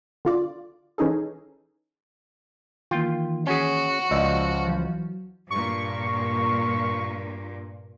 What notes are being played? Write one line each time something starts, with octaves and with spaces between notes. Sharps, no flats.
D3 F4 D5
E3 C#4 D#4 G#4 A4
D#3 E3 A#3 F4 G5
C#4 F#4 G#4
C#2 F3 D5 D#5 E6
E3 F#3
G2 A#2 C#6